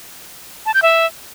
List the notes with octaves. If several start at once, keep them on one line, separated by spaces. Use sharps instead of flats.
A5
G6
E5